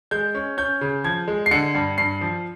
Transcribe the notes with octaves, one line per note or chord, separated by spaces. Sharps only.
G#3 G6
C#4
C#4 G6
C#3
F3 G#6
G#3
C7
D3 C#7
G2
G2 C7
F3